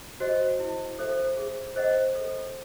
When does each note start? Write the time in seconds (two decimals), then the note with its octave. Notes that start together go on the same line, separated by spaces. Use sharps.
0.20 F#4 C5 D#5
0.59 E4
0.99 A4 C5 E5
1.37 G#4
1.76 C5 D#5 F#5
2.15 A4